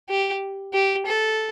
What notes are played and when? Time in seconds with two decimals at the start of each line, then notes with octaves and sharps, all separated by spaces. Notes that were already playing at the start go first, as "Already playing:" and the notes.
0.09 G4
0.73 G4
1.06 A4